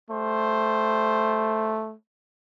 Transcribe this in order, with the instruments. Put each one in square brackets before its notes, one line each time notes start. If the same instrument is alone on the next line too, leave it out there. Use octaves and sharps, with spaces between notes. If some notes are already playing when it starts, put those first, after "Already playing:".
[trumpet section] G3 C5 [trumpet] A3